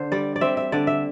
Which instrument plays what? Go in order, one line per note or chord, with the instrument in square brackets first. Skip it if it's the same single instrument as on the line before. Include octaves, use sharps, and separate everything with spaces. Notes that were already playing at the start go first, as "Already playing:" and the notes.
Already playing: [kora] D3 C5
G3 D5
D5
C4 E5
E5
D3 D5
E5